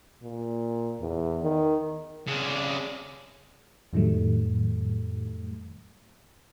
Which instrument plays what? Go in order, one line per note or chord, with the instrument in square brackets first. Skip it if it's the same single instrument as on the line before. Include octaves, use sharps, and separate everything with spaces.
[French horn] A#2
E2
D#3
[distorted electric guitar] C#3 D4
[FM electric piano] F2 A2 D#3 F#3 G3 A3